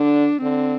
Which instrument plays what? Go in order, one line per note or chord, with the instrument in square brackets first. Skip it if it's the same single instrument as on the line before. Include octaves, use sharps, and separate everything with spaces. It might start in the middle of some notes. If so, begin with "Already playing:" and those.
Already playing: [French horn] D3 [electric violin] D4
[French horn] D3 [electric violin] C4